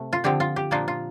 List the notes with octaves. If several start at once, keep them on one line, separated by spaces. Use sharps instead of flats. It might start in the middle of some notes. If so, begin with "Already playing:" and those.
Already playing: C3 A3
F4
D3 F3 C4 G4
F4
G4
A#2 F3 A#3 D4 F4
F4